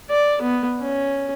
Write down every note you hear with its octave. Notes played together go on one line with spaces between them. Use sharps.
D5
B3
C#4